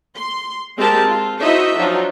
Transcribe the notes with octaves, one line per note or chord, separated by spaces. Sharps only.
C6
G#3 C4 G4 A#4 A5
F4
D#4 E4 F#4 C5 D#5 E5
F3 F#3 D4 D#4 F4